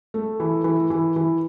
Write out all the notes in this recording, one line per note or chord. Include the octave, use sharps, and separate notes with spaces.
A3
E3
E3
E3
E3